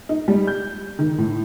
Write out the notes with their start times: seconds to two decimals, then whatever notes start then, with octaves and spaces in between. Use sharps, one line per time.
0.09 D#4
0.28 G3
0.47 G6
0.99 D#3
1.18 A2